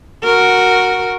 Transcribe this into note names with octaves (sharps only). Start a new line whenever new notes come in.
F#4 A#4